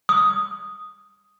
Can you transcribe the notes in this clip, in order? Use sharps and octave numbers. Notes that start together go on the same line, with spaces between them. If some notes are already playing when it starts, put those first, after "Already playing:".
D#6